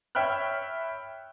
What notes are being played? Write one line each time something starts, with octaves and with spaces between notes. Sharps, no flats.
C#5 E5 G5 B5 F6 F#6